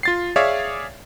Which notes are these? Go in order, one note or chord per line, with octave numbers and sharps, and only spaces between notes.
F4 A6 C7
G#4 C#5 D5 E5 F5